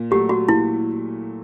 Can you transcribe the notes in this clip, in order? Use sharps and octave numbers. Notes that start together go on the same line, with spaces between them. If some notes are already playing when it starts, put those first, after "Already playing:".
Already playing: A#2
F#3 A3 G4
F#4
A#2 E4